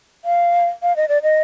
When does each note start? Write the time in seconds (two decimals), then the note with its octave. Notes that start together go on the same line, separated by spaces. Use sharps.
0.25 F5
0.83 F5
0.96 D#5
1.08 D5
1.22 D#5